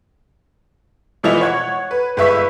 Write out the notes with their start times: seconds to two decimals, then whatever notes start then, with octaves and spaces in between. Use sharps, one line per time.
1.23 B2 E3 F3 E4 D#5 F7
1.41 C#5 F#5 G#6
1.91 B4
2.17 G1 G#3 B4 E5 C#6 B6